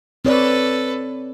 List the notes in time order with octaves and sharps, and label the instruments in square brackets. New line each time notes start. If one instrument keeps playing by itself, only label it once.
[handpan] C4 C#5 D5 [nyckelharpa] A4 B4